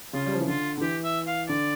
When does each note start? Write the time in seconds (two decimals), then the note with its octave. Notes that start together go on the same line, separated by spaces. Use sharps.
0.13 C#3 F4
0.26 G3
0.33 F3
0.40 E3
0.47 D3 F4
0.77 D3
0.81 E3 G4
1.04 E5
1.27 F5
1.49 D3 D5